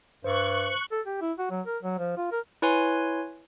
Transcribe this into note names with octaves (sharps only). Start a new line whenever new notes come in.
G2 C5 C#6 F#6
A4
G4
E4
F#4
F#3
A#4
F#3
F3
F4
A#4
E4 B4 C#5 G#5 C6